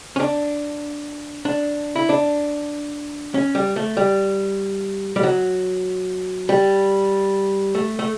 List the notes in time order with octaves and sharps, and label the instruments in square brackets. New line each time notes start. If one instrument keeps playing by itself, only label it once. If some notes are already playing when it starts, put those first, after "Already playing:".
[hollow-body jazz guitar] C#4
D4
D4
E4
D4
C#4
G3
A3
G3
G3
F#3
G3
A3
A3